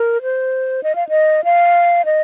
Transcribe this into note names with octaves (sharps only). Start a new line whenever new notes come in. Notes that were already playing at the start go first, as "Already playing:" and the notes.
Already playing: A#4
C5
D#5
F5
D#5
F5
D#5